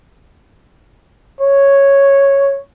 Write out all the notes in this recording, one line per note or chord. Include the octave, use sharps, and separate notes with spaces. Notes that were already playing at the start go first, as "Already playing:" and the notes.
C#5